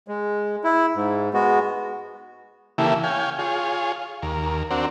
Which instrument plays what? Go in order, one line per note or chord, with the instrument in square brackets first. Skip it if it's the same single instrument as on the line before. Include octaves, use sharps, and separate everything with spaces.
[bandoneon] G#3
E4
G#2
G#3 B3 F#4
[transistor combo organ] C#3 E3 A#3 E4 G4 A4
C#5 F5 G5 G#5
F4 G#4 C#5
D#2 A#4
C4 D4 F#4 A#4